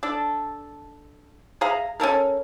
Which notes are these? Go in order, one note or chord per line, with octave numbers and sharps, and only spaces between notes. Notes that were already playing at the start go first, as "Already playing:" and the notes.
D4 A4
G#4 E5 F5 A#5
C#4 E4 A4 A#4